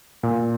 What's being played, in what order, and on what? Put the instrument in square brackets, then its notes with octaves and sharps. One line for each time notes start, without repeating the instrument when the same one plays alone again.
[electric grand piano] A#2